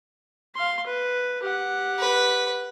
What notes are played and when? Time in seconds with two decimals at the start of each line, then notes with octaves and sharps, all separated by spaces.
0.55 F5 C6
0.86 B4
1.43 G4 F#5
1.99 B4